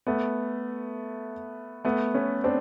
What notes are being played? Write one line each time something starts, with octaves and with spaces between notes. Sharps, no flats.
A3 B3
A3 B3
B3 C#4
C4 D4